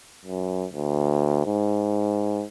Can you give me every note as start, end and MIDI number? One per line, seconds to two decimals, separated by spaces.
0.25 0.66 42
0.72 1.45 38
1.47 2.44 44